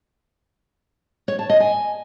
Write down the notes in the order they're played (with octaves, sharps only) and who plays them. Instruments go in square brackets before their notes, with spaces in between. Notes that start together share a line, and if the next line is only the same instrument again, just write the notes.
[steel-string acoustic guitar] C#5
A5
D#5
G#5